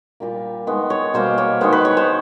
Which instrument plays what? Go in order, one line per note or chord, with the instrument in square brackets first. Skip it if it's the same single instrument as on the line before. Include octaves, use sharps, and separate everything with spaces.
[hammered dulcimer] A#2 G3 A#3
D#3 G#3 B3
C#5
B2 G3 A#3 C5
C#5
D#3 G#3 B3 C5
B4
C#5
C5